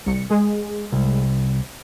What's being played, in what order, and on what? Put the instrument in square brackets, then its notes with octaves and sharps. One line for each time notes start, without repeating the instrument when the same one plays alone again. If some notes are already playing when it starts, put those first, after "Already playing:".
[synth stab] C2 C#7
G#3 G#4
[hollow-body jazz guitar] C2